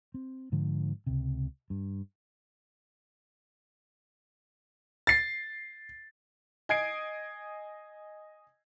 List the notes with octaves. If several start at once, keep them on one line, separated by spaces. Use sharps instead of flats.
C4
G#2 D3 F3
C#2 C3
G2
A6 C7
D#5 G#5 D#6 G#6 C7 D7